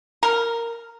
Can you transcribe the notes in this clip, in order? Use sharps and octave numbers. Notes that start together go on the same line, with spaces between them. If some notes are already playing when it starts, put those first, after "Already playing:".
A#4